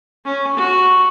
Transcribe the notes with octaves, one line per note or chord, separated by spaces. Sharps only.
C#4
F#4